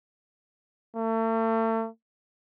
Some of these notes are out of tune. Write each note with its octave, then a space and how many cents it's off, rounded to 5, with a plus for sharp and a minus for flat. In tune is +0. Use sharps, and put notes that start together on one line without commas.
A3 +40